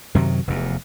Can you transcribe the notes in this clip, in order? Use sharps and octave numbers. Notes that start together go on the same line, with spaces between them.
F#2 C3 D#3 F#3
F1 E2